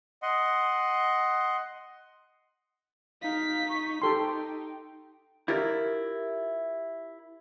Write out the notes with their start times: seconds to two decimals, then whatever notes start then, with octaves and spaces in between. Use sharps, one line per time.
0.22 D#5 F#5 C6
3.22 D#4 F5 B6
3.69 C#6
4.02 D#4 G4 A4 G5 C6
5.48 E4 F4 G4 A#4 D5